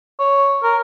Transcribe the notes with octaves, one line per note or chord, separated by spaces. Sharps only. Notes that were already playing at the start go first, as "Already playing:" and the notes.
C#5
A#4